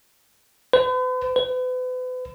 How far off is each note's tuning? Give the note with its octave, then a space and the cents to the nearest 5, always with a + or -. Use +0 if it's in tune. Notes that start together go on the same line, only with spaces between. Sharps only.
B4 +45
B4 +40